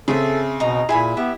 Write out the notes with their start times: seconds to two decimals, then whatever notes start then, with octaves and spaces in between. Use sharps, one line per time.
0.08 C#3 C4 G#4 A4 E5
0.60 B2 D#4 D#5 A#5
0.89 A#2 E4 G#4 G#5 B5
1.17 B3 G4 E5